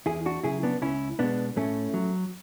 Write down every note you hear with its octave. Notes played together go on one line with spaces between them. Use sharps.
E2 E4 G#4
D4 F#4
C#3 F#3 E4 G#4
B3 D4
C#2 C#4 E4
B2 G#3 B3 D4
A2 A3 C#4
F#3